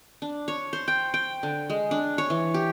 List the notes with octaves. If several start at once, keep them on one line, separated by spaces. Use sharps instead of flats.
D4
C#5
C5
G5
G5
D3
G#3
D4
C#5
E3
G4